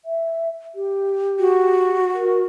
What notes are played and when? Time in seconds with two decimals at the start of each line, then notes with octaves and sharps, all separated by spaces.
0.05 E5
0.75 G4
1.40 F#4
2.14 A#4